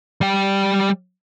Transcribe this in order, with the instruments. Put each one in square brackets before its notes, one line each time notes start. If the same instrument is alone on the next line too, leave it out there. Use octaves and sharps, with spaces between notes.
[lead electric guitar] G3 G5